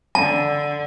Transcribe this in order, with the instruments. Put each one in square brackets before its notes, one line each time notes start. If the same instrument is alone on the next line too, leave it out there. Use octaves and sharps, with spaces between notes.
[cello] D3 [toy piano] A5